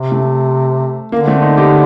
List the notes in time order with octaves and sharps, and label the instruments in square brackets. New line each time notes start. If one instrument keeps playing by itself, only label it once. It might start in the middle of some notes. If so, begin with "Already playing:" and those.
Already playing: [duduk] C3
[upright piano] A3
[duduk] D3 [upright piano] A#3
[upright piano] A3 C4
C4 D#4
D#4 G4